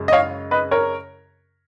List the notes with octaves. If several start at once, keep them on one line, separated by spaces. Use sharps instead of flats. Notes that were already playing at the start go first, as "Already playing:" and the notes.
Already playing: F#2 C#3 G#3
D#5
C#5 F5
B4 D#5
A#4 C#5